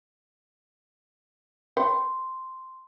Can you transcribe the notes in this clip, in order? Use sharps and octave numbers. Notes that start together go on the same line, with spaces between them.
B4 C#5 G5 C6